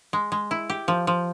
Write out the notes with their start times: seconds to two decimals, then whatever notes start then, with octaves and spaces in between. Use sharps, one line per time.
0.13 G#3
0.32 G#3
0.51 E4
0.70 G4
0.88 F3
1.07 F3